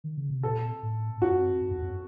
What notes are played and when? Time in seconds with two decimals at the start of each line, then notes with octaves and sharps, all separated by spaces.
0.04 D#3
0.18 C#3
0.30 C3
0.43 A#2 A4
0.83 A2
1.17 A2
1.22 F#2 F#4
1.61 F#2
1.71 F2
1.82 F#2